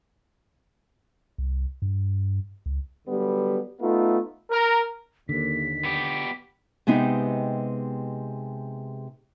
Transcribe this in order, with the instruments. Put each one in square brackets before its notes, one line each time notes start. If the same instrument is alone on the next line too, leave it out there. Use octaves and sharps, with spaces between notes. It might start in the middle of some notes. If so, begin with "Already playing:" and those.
[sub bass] C2
G2
C#2
[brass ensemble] D3 F#3 G3 B3
A3 B3 D#4 F4
[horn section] A#4
[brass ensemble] D#2 [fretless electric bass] D3 [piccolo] B6
[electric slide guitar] B3 G4
[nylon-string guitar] C3 G#3 B3 C4 D#4 G4